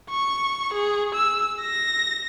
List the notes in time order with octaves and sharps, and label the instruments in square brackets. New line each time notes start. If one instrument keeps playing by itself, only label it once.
[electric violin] C#6
G#4
E6
A#6